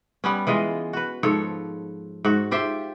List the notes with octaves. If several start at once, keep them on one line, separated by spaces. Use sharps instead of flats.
G3 B3 C#4
E3 G#3 F4 D#5
F#4 B4
G#2 F3 A4 C#5
G#2 F#4
F4 G4 C5 E5